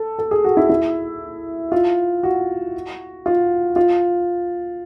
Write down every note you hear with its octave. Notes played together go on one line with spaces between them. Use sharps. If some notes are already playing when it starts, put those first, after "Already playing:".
Already playing: A4
A4
G#4
F#4
E4
E4
F4
F#4
F4
F4